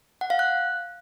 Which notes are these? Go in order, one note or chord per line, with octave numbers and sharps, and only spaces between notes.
F#5
F5
F#6